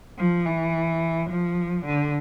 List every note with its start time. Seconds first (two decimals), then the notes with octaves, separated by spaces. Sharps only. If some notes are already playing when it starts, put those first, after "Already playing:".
0.18 F3
0.46 E3
1.30 F3
1.86 D3